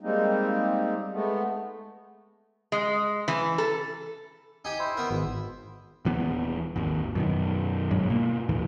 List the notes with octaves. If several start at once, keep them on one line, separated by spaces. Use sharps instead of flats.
G3 G#3 A#3 C4 D#4
G#3 A3 B3
G#3
E3
A4
D#4 G4 G#5
E4 C5
B3 A#4
G#1
D#1 E3 B3
G#1 D#2
F#2 B2 D#3
G#1 G2 F#3 G#3
B2 A#3
D#2 A2 E3